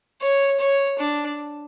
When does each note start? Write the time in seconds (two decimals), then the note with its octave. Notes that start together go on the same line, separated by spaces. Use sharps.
0.22 C#5
0.60 C#5
0.99 D4